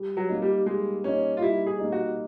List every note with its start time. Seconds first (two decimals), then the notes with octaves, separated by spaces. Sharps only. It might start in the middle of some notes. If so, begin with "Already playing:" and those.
Already playing: G3
0.17 F#3
0.29 A#3 D#4
0.42 G3
0.66 G3 G#3
1.04 A#3 C#4 D#4
1.37 F4
1.42 G3 E4
1.67 G#4
1.79 A#3 D#4
1.92 F#4